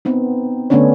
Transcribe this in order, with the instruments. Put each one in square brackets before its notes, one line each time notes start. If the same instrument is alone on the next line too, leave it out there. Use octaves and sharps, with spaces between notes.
[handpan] B3 C4 D#4
D3 A3 B3 C#4 D4 C#5